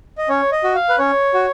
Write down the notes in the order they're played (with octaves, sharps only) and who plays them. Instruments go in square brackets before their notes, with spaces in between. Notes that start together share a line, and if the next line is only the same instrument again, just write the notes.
[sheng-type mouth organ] D#5
C#4 C#5
D#5
F#4
F5
B4
C#4 C#5
F#4